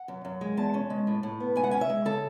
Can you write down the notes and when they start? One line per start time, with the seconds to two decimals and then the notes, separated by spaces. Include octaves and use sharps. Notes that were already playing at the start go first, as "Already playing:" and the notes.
Already playing: F#5
0.08 F#2
0.25 F#2
0.41 G#3
0.57 E2 A5
0.74 C#4
0.90 G#3
1.07 A2
1.23 A2
1.40 B3
1.56 G#2 G#5
1.64 F#5
1.71 C#4 G#5
1.81 E5
1.89 G#3
2.05 C#3 A4